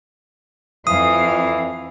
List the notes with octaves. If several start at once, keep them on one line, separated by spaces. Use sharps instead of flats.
F2 E3 F5 D#6